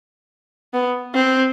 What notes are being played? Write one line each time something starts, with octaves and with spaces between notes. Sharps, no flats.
B3
C4